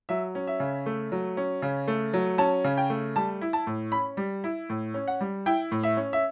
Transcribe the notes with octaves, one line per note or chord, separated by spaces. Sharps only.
F#3 E5
C#4
E5
C#3
A3
F#3
C#4
C#3
A3
F#3
C#4 A5
C#3
G5
A3
G3 A5
E4
A5
A2
C#4 B5
G3
E4
A2
C#4
F#5
G3
E4 G5
A2
E5
C#4
E5